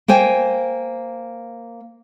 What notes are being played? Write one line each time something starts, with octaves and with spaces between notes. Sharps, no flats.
A#3 C5 G5 G#5